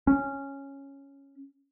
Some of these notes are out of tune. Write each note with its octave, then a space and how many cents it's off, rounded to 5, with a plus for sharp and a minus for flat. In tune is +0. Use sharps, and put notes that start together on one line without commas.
C#4 -5